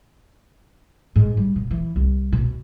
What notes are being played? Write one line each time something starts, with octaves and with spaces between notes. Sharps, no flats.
G#2
G3
B2
E3
C2
B2